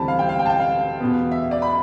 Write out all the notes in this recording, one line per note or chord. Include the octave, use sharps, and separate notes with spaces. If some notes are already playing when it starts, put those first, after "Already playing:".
Already playing: D2 C3 E3 G3 C4 A5 B5
F5
G5
F5
G5
A5
G5
F5
E2 B2 B3
E5
D5
B5